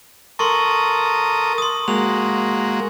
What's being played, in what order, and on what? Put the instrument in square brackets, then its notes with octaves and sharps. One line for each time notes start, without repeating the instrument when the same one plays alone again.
[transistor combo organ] A4 A#4 D#6 [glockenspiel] C6 C#6
[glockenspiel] C6 D#6
[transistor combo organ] G#3 A#3 F#4 [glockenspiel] F7